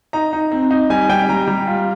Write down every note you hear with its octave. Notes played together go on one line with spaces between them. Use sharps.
D#4 A#5
D#4
C4
D#4
G3 G#5
G3 G5
G3 A#5
G3
F4